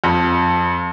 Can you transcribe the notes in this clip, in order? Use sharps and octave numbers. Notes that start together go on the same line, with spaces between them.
F2